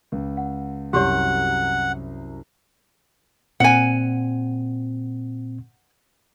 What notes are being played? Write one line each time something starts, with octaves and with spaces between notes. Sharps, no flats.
C#2
F#5
C2 F#2 F#4 G4 C#5 F#5
A#2 C4 F#5 G#5